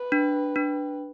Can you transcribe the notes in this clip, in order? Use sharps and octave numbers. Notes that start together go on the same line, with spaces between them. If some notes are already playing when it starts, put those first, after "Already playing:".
Already playing: B4
D4
D4